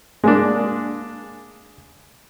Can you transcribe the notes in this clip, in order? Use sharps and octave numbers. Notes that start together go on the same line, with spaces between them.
G#3 A#3 D4